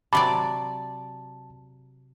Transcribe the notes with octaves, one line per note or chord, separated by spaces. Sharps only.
C3 F#3 D5 A5 B5 D6